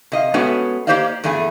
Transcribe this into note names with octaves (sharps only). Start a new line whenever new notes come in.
C3 D#5 F5
G#3 A3 B3 C#4 D4 F#4
A#3 G4 C5 D5 D#5 F5
E2 G2 A3 G#4 G#5